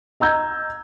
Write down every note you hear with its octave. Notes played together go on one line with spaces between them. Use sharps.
D#5 A#5 E6 G6 G#6